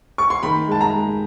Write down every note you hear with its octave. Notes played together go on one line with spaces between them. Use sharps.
C#6
C6
D#3 B5
G#3 A5
A#5
G#3